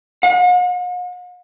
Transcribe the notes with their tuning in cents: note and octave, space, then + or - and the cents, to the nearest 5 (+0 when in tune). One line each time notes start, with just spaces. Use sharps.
F#5 -45